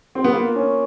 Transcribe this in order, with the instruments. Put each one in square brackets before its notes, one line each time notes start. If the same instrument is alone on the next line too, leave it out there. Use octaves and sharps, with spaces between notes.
[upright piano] C4
B3
[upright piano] A#3 [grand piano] F4
[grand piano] C#4